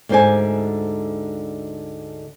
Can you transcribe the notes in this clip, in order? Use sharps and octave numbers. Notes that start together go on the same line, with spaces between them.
D2 G#2 D3 C5 D5 G#5